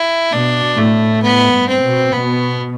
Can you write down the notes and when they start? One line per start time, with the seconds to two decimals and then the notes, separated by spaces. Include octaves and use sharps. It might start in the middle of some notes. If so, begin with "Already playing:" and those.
Already playing: E4
0.33 B2 D4
0.77 A2 A3
1.23 A2 B3
1.53 G2
1.68 C4
1.83 B2
2.12 B2 B3